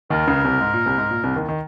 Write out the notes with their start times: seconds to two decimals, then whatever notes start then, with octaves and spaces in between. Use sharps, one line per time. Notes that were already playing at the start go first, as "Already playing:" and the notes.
0.10 D#2 D#3 A#4
0.27 C#2 C#3
0.44 C2 C3
0.61 G#2
0.74 A#2
0.86 C2 C3
0.98 G#2
1.11 A#2
1.23 C2 C3
1.35 D#2 D#3
1.49 D#3